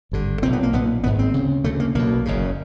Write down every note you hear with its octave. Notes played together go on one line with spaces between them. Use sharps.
G#1 G2 D3
B1 A#2 C4
B3
A#3
B1 A#2 B3
G#1 G#2 B3
C4
D2 C#3
D2 C#3 A3
A#3
B1 B2 A#3
F#1 F#2 C#3